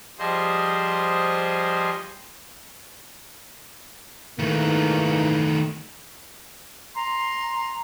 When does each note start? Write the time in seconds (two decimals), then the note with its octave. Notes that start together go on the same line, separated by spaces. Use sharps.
0.19 F3 G3 G#4 C5 D#5
4.39 G#2 D#3 E3 A3 A#3
6.94 A#5 C6